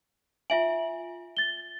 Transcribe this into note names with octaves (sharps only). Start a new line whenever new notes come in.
F4 E5 G#5 F#7
A6 G7